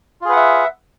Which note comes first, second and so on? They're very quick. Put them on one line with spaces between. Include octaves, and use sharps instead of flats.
F4 G#4 B4 F#5 E5